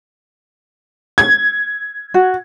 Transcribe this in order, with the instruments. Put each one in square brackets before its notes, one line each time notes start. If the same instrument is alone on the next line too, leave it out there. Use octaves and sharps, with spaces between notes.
[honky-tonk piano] G#6
[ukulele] F#4